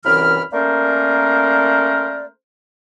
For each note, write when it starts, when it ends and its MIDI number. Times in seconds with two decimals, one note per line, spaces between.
0.05 0.43 36
0.05 0.43 42
0.05 0.43 52
0.05 0.43 83
0.05 0.43 89
0.53 2.27 57
0.53 2.27 58
0.53 2.27 61
0.53 2.27 70
0.53 2.27 72
0.53 2.27 74